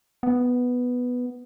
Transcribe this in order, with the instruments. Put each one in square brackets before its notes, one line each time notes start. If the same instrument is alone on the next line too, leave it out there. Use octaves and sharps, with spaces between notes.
[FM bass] B3